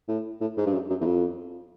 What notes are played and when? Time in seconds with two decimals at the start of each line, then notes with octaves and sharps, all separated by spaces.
0.08 A2
0.41 A2
0.57 G#2
0.66 G2
0.74 F#2
0.90 F#2
1.01 E2
1.06 F2